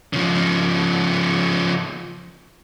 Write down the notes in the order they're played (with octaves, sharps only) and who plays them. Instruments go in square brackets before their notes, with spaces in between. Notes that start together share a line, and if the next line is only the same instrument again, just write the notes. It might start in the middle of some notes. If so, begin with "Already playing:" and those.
[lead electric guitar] C#3 F3